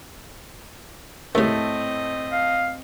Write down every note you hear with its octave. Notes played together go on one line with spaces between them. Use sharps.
D#2 A2 C#3 A3 C4 D#5
F5